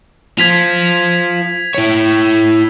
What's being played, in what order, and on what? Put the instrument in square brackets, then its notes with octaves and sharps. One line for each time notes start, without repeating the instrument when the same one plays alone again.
[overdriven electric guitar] F4 C5 [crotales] G#6 B6 F7
[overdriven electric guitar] E4 C#5